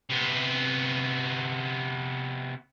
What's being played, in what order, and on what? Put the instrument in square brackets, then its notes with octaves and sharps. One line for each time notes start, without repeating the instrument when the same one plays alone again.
[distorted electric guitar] C3 B3